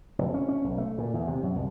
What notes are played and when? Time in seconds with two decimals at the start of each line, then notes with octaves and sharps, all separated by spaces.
0.18 F1
0.34 C#4
0.49 C#4
0.64 B1
0.78 A3
0.98 A#2
1.14 E2
1.28 C3
1.43 F#2
1.56 C2